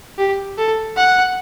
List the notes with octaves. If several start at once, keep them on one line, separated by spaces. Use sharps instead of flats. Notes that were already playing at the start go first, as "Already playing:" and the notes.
G4
A4
F#5